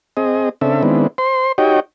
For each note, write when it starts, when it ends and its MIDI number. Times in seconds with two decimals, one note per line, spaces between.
0.17 0.49 60
0.17 0.49 68
0.17 0.49 75
0.61 0.82 49
0.61 0.82 60
0.61 0.82 62
0.61 0.82 69
0.61 0.82 76
0.83 1.07 51
0.83 1.07 56
0.83 1.07 59
0.83 1.07 60
0.83 1.07 62
0.83 1.07 64
1.18 1.52 72
1.18 1.52 84
1.58 1.80 63
1.58 1.80 66
1.58 1.80 67
1.58 1.80 73
1.58 1.80 75
1.58 1.80 79